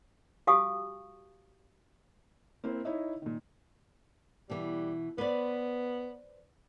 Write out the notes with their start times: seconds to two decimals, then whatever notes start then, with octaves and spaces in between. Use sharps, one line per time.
0.47 F#4 G4 F5 G#5 C#6 D#6
2.64 A#3 C4 E4 C5
2.85 D#4 E4 C#5 D#5 E5
3.22 A#2 D#3
4.50 B2 E3 G3
5.18 B3 B4 C5 D5